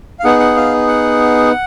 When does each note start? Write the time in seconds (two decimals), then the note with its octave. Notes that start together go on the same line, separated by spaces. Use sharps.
0.20 F5
0.24 B3 D#4 G#4 F#5
0.40 F#5
0.56 F5
0.88 F#5